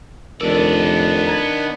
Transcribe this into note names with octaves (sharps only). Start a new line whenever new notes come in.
F1 D#3 B3 D4 A#4 D5
A#5 G#6 A6